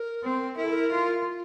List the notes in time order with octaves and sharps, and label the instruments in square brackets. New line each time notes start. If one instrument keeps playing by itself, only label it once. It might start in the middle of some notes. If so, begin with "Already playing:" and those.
Already playing: [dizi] A#4
[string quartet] C4
[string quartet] E4 [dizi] A#4
[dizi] A4
A#4
[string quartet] F4
[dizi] F4